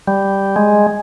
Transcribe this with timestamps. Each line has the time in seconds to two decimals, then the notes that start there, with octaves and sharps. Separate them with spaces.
0.07 G3
0.56 G#3